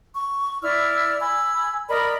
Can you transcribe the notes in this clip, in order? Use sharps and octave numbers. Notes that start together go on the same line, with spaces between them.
C#6
E4 D5 E6 F6
G#5 B5 E6
A#4 D5 D#5 B5